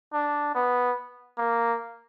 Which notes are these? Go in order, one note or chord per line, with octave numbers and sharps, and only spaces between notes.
D4
B3
A#3